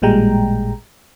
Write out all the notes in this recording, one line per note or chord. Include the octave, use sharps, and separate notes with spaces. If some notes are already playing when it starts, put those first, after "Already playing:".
A1 A#2 G3 G#3 G5 A#5